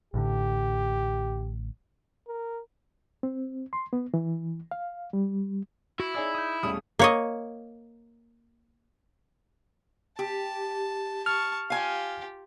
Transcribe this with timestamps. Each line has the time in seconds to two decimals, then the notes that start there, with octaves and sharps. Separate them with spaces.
0.14 A1 A2 D3 G4
2.28 A#4
3.23 C4
3.73 C6
3.93 B3
4.14 E3
4.71 F5
5.13 G3
6.00 E4 F#4
6.15 D#4 G#4 C#5 D5 E6
6.35 D#6 G6
6.63 E1 G3 A3 C#4 D#6
6.99 A#3 C#5 D#5
10.19 G4 A5
11.26 A5 C#6 F6
11.70 F4 G4 F5 G#5